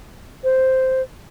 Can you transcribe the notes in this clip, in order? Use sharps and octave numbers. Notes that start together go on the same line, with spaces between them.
C5